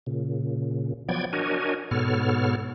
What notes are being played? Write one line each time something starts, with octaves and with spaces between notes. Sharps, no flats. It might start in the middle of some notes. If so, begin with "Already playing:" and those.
A#2 C#3
F3 F#3 B3 D5 G5 G#6
D4 F#4 A#4 C#5 D#5 G#5
G#2 B2 B3 A4 C#5 F6